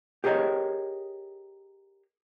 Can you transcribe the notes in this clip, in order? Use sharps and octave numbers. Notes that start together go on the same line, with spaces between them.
G4 G#4 A#4 C#5 D#5